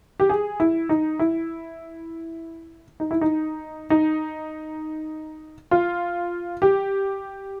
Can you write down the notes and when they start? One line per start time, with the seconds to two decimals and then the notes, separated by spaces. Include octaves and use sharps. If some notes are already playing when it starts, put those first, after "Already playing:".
0.20 G4
0.29 G#4
0.60 E4
0.89 D#4
1.19 E4
3.00 D#4
3.11 E4
3.21 D#4
3.90 D#4
5.71 F4
6.62 G4